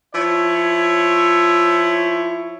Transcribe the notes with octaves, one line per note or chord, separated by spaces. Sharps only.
F3 E4 C#5